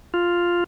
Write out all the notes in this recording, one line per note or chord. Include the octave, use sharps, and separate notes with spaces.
F4